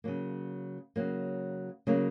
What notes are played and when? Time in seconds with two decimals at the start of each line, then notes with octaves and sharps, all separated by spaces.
0.04 C#3 F#3 A#3
0.96 C#3 F#3 A#3
1.87 C#3 F#3 A#3